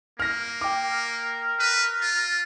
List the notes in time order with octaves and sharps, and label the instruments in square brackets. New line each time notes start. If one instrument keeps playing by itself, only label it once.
[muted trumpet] A#3 [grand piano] F6 A#6
[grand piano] G5 D6
[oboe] A#4
[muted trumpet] B4
F4